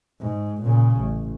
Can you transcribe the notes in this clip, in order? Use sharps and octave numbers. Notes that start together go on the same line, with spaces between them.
G#2
A#2 C#3
A1